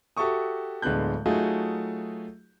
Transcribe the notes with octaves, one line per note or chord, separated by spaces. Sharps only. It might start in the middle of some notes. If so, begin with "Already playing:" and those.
F#4 G4 A4 E5 C#6 D#6
D1 D3 G#3 B3 F#6 G6
F#3 A3 D#4 F4 F#4 G#4